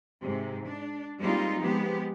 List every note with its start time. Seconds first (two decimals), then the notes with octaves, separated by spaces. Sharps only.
0.21 G#2 C3
0.68 D4
1.18 G3 G#3 A#3 C4 D#4 F4
1.59 F3 G#3 B3 G4